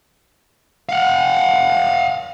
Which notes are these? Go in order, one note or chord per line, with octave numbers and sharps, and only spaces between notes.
F5 F#5